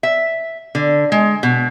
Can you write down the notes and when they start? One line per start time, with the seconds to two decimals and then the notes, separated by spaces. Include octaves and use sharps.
0.03 E5
0.75 D3
1.12 G#3
1.43 B2